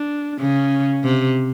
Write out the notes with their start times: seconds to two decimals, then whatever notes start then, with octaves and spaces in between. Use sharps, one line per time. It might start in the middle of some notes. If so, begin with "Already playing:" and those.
Already playing: D4
0.39 C#3 C#4
1.04 C3